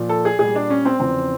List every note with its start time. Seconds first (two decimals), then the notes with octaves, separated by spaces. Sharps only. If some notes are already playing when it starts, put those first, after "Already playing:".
Already playing: A#2 F3
0.09 A4
0.25 G#4
0.39 A#2 G3 G#4
0.55 D4
0.70 C#4
0.85 C4
1.00 E2 C#3 F3 C4